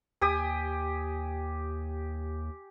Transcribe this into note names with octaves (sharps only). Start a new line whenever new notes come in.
D#2 G4 G#5 D#6